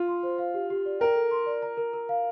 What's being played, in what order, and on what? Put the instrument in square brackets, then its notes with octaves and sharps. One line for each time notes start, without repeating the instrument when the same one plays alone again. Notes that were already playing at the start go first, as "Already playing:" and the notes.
Already playing: [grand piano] F4
[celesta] C6
C5
F5
G4
G4
D5
[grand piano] A#4 [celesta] G5
[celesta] A4
C6
D5
A#5
A#4
A#4
F5